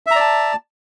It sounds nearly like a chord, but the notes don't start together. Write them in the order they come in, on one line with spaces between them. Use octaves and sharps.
E5 A#5 D5 A5